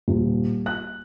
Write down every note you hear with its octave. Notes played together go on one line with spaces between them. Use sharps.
D#1
F#6